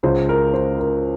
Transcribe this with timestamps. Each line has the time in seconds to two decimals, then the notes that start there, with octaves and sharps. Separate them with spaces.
0.03 C#2 C#3 G#3 C5
0.29 A#4
0.54 C5
0.79 A#4